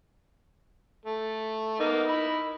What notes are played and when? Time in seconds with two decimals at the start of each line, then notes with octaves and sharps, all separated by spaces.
1.05 A3
1.80 A#3 B3 D#4
2.08 B5 E6